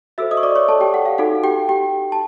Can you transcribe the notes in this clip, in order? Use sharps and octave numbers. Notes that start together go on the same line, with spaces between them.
F#4 A4 C5 E5 E6
D#5 D#6
C#6
D5 D6
C#5 C#6
A4 A5
G4 G5
F#5
F5
D#4 F#4 A4 F#5
G4 G5
G4 G5
A5